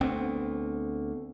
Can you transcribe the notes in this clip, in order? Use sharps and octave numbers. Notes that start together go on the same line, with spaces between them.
D2 B3 C4